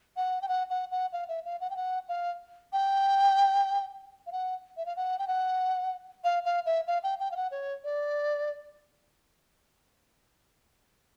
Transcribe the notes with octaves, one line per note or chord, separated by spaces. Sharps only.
F#5
G5
F#5
F#5
F#5
F5
E5
F5
F#5
G5
F#5
F5
G5
F5
F#5
E5
F5
F#5
G5
F#5
F5
F5
E5
F5
G5
G5
F5
F#5
C#5
D5